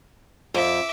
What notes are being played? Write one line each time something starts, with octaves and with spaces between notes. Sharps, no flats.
F2 E5 D6